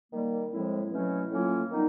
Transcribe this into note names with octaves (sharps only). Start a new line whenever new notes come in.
D#3 G3 A#3
A2 F3 G#3 C4 E4
B2 F#3 A3 C#4 E4
A2 F#3 A#3 C#4 F4
D#3 G3 B3 D#4